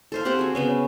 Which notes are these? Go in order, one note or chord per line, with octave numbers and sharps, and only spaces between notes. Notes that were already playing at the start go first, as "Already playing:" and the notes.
A4 C5 F5
C4 G4 A4 F#5
F#4 G#4
C#3 B3 C#4